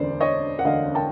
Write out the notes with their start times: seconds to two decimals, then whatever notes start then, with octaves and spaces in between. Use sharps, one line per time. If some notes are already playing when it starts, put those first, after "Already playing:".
Already playing: E1 D2 D3 C5 D5
0.20 C#5 D#5
0.59 F#5
0.64 E1 D2 D3 D#5 F5
0.95 G5 A5